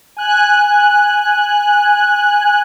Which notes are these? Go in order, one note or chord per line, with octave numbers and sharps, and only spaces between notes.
G#5 F#6